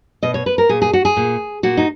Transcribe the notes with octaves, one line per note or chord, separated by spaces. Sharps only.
B2 D#5
C#5
B4
A#4
A#2 G#4
G#4
F#4
G#4
A#2
A#2 F#4
D#4